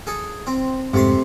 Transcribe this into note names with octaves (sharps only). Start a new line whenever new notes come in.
G#4 A4
C4
F1 G#2 C3 A3 C6